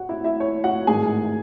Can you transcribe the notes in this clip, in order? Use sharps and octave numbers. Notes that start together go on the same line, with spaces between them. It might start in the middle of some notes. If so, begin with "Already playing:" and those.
Already playing: F#4 F#5
E4 E5
E4 E5
C#5
F#4 F#5
A1 G#2 D#3 G#3 G#4 G#5